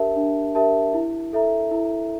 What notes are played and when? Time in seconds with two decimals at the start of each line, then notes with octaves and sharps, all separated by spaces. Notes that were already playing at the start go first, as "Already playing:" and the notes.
Already playing: D4 G4 A#4 E5 A5
0.16 D4
0.55 G4 A#4 E5 A5
0.94 E4
1.33 A4 E5 A#5
1.71 E4